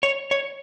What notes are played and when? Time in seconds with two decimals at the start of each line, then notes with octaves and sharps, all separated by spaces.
0.03 C#5
0.31 C#5